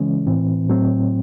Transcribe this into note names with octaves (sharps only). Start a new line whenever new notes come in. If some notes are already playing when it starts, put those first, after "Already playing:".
Already playing: C#3 E3 G#3 C#4
A2 E3 C4
A2 F#3 C4